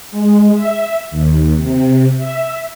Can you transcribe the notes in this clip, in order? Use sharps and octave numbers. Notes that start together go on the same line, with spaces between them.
G#3
E5
D#2
C3
E5